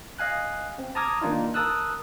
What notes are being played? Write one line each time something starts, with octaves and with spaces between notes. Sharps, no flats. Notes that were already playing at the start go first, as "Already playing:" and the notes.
D#5 F5 G#5 F#6
C4
A5 A#5 D6 D#6 F6 G#6
D#3 A#3 D4 D#4 F4
A#4 A5 D#6 E6 F#6